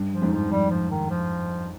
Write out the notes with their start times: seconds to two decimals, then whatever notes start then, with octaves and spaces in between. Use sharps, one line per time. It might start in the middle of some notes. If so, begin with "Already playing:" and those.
Already playing: G2
0.13 F3
0.22 F2 G#2
0.33 F3
0.51 G3
0.70 F3
0.91 D#3
1.10 F3